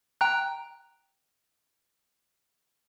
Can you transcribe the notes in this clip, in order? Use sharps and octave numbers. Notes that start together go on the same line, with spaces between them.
G5 A#5 F#6